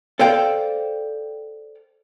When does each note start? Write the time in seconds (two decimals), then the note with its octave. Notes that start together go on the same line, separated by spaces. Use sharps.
0.19 A4 C5 D5 F5 G5